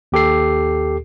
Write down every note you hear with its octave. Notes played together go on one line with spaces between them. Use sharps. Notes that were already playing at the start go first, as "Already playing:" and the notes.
D#2 G4 A4 C7